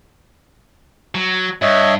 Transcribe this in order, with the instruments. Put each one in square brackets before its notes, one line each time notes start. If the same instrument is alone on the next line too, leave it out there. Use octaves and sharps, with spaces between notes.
[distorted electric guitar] F#3
[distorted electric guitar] G2 [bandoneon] C#5 D#5 E5